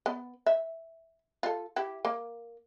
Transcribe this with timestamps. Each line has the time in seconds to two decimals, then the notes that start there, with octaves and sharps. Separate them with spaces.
0.06 B3
0.46 E5
1.43 F4 A4
1.76 E4 G4
2.05 A#3